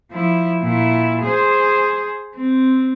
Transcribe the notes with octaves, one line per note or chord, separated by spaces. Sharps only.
F3 E4
A#2 E4
G#4 C5
C4